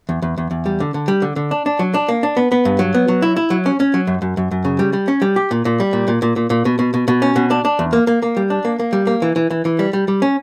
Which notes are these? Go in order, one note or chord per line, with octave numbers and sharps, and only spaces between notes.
E2
E2
E2
E2
G3
D3
D3
G3
D3
D3
D4
D4
F#3
D4
A#3
D4
B3
B3
G2
F#3
B3
F#3
E4
E4
F#3
C#4
C#4
F#3
F#2
F#2
F#2
F#2
C#3
G3
G3
C#4
G3
G4
A#2
A#2
G3
A#2
A#2
A#2
A#2
A#2
B2
B2
B2
B2
C#4
B2
D4
D4
E2
A#3
A#3
A#3
G3
D4
A#3
A#3
G3
A#3
E3
E3
E3
E3
G3
G3
G3
C#4